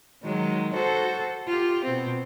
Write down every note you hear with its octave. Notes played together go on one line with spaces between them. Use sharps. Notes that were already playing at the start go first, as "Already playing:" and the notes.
D#3 F#3 G#3
F#4 A4 C5
F4 G4
B2 C4